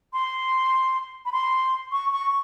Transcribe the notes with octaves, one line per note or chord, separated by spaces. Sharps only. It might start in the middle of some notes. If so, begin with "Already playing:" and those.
C6
B5
C6
C#6
C#6